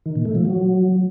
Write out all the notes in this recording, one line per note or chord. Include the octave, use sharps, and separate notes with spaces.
D#3
A#2
A3
F3
F#3